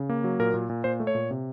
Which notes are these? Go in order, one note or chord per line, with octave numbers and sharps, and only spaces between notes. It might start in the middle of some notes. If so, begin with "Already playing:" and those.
Already playing: C#3
A#3
F#3
A#2 A#4
A#2
A#2
A#2 C5
A3
C#5
A#2
C3